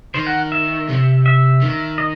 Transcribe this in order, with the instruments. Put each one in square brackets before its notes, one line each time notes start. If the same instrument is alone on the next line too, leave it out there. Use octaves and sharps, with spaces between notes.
[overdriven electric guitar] D#3 [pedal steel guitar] C5
[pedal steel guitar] F#5
E5
[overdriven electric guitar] C3
[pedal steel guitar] E5
[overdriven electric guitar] D#3
[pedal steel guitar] D#5